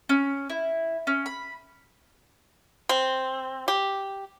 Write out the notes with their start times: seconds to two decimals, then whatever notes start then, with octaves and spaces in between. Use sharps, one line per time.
0.09 C#4
0.50 E4
1.07 C#4
1.26 B5
2.89 C4
3.68 G4